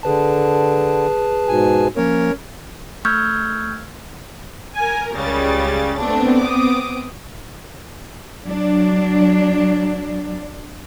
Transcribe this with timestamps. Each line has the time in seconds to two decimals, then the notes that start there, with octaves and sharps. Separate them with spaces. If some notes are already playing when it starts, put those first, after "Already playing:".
0.03 D3 G#4 B4 A5
1.48 G#2 B2 G#5
1.97 F3 A#3 C#4 A#4 C#5
3.05 A3 C#6 E6 F6 G6 G#6
4.76 A#4 G#5
5.12 C#2 C#3 G3 A6
5.99 A3 B3 C4 D4
6.40 D6 D#6
8.45 F#3 D4